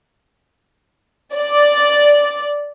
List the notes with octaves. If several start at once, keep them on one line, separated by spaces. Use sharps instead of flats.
D5